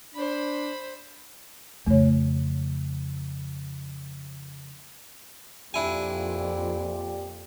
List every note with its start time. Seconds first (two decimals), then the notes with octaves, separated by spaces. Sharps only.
0.15 D4 C5 B5
1.86 F2 C#3 A3 C#5
5.74 F2 A#2 D4 E4 G4 D5 G#5